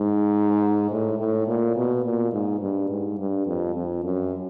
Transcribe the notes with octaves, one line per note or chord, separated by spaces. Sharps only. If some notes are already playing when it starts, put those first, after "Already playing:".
Already playing: G#2
A2
A2
A#2
B2
A#2
G#2
G2
G#2
G2
F2
F2
F#2